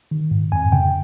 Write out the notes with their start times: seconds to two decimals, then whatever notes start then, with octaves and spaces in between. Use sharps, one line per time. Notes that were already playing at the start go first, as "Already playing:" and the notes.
0.11 D#3
0.31 G#2
0.52 F2 G#5
0.72 C#3 G5